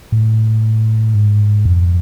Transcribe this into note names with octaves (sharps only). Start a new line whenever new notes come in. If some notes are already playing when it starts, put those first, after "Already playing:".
A2
G#2
F2